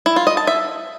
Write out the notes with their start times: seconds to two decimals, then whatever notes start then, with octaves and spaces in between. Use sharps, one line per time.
0.06 E4
0.16 F4
0.27 D#5
0.37 A5
0.47 E5